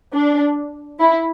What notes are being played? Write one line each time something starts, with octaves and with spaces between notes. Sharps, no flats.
D4
E4